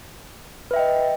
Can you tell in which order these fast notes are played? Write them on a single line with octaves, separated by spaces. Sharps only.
B4 E5 G5 D#5